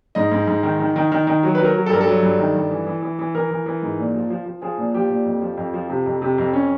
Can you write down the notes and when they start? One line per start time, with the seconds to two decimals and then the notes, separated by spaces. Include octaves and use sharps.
0.15 G#2 D#5
0.32 G#2
0.47 G#2
0.63 D#3
0.79 D#3
0.96 D#3
1.12 D#3
1.27 D#3
1.43 F#3
1.55 B4
1.59 F#3
1.65 A#4
1.75 F#3
1.86 A4
1.90 G2 A#4
2.01 A4
2.07 F#3
2.23 G2
2.39 D#3
2.55 G2
2.71 E3
2.87 E3
3.03 E3
3.19 E3
3.35 E3 A#4
3.51 E3
3.66 E3
3.83 G#2
3.98 A#2
4.14 F3
4.30 F3
4.46 F3
4.62 F3 G#4
4.78 A#2
4.94 F3 G4
5.10 A#2
5.26 F2
5.42 F3
5.57 F2
5.74 F3
5.89 C3
6.06 F2
6.22 C3
6.38 F2
6.53 C#4